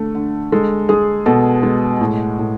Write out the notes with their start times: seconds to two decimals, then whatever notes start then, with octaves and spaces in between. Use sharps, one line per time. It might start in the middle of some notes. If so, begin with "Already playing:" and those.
Already playing: D3 A3
0.15 D3
0.52 G#3 A4
0.89 G#3 G#4
1.26 B2 A4
1.63 G#3
2.01 A2
2.38 A2